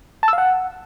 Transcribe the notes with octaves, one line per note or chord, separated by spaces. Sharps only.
A5
E6
F5
F#5